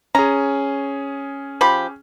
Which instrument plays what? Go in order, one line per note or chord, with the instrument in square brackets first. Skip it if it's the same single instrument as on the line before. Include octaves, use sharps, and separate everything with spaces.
[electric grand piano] C#4 G#4 [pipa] A#5
[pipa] F3 G4 B5